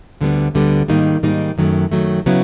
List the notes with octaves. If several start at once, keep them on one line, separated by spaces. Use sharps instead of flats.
D2 D3 G3 B3
D2 D3 G3 B3
G#2 D#3 G3 A#3 D#4
G#2 D#3 G3 A#3 D#4
F#2 D#3 F#3 A3
F#2 D#3 F#3 A3
C#3 F#3 B3 E4